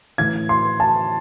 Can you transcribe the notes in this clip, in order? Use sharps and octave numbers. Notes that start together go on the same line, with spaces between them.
A2 E3 G#6
C6
A5